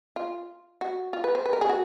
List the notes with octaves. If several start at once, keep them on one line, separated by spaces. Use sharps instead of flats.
F4
F#4
F4
B4
C5
B4
A#4
G#4
F#4